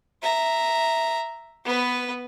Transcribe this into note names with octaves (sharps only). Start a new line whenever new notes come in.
E5 A#5
B3 B4